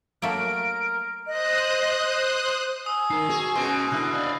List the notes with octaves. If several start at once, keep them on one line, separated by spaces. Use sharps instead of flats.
F#3 A3 A#3 A#4 D7
C5 D#5 D#6 F#6
G#5 D#6 E6
D#4 A#4 C7
F#4 G#4
B2 C#4 C6
D3 D4 E4 E6 F#6
D5 D#5 F5